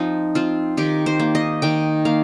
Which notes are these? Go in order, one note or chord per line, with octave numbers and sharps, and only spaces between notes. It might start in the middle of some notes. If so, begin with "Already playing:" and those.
Already playing: F3 C4 D#4
C4 F4
D#3 G4
C5
A#3
D#5
D#3 G5
A#3 F5